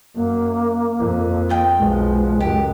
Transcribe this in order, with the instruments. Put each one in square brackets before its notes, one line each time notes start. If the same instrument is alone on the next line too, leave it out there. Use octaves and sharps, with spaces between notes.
[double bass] F#2 [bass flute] A#3
[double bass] F2
[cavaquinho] F4 D#5 G5
[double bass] B1 F3 [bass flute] G#3
[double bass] C#2 F#2 [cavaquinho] G4